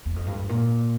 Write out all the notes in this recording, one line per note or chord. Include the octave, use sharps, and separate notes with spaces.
E2
F2
G2
G2
A#2